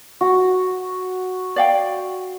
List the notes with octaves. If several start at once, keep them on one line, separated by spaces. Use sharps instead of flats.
F#4
D5 F5 G5